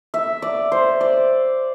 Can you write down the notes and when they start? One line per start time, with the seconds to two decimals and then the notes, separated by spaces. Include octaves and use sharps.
0.14 E5
0.42 D5
0.72 C5
1.01 D5